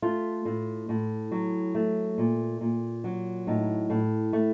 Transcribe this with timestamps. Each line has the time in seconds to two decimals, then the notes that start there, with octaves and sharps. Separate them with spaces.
0.02 A3 F4
0.45 A2
0.89 A2
1.31 F#3
1.75 A3
2.18 A#2
2.61 A#2
3.04 F#3
3.47 A2 D#4
3.90 A2
4.33 A3